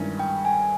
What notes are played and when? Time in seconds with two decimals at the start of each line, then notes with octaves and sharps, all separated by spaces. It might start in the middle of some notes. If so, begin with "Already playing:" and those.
Already playing: G2 D#3 G#3 C#4 E4
0.20 G5
0.45 G#5